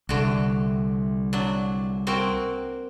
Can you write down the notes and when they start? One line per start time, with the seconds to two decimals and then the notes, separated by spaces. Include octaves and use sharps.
0.09 C2 D3 F#4
1.33 F#3 D4
2.07 A#3 C4 F#4